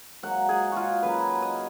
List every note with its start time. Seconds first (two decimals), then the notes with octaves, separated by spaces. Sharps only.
0.23 G#2 F#3 A#3 F#5
0.49 G#4
0.72 F4 F#4
1.03 C#3 F#3 A#3 B4
1.42 D#5